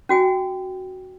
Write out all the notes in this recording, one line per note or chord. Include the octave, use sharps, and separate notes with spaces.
C#4 F#4 G5 G#5